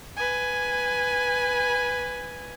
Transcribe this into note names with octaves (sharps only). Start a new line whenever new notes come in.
B4 G#5